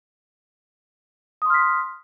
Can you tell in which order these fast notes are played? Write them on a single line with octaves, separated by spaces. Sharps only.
D#6 C6 F6 B6